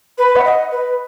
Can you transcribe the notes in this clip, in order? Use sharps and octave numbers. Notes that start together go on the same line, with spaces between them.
B4
F#5
D#5
B4